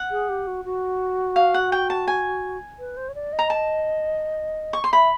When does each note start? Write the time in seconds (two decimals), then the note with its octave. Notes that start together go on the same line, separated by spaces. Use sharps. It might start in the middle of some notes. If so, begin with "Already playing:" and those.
Already playing: F#5
0.11 G#4
0.29 G4
0.47 F#4
0.65 F#4
1.36 F5
1.54 F#5
1.72 G5
1.90 A5
2.07 G#5
2.79 B4
2.97 C5
3.09 C#5
3.15 D5
3.33 D#5
3.39 A#5
3.50 A5
4.73 C#6
4.84 C6
4.93 E5 B5